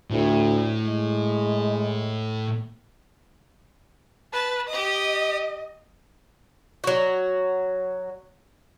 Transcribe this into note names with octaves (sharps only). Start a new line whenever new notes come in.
D2 A2
G#3
B4 A5
G4 D#5 D#6
F#3 F#4